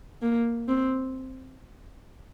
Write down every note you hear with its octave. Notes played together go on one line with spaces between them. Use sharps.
A#3
C4